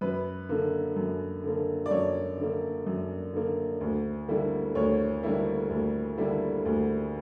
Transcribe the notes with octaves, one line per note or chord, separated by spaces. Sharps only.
F#2 B4
D3 A#3
F#2
D3 A#3
D5
F#2 C#5
D3 A#3
F#2
D3 A#3
D2
D3 G3 A#3 E4
D2 C#5
D3 G3 A#3 E4
D2
D3 G3 A#3 E4
D2